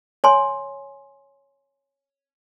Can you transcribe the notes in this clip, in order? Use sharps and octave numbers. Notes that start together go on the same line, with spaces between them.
C#5 G#5 C6